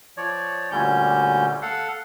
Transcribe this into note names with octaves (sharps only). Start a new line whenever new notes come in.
F3 C#5 D5
D2 A#2 D3 G3 C#4 G6
A4 F5 F#5